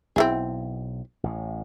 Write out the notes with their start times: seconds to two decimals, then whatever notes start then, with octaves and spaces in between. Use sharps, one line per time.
0.16 B1 C4 E4 G#4
1.23 A1 A2